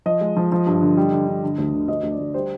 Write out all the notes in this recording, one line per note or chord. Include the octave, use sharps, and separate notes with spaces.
F3 D#5
G#3
F3
F3
G2
D3
G3
D3
D3
D3
D2
D3
D2 D#5
D2
D5
D2
G3 C5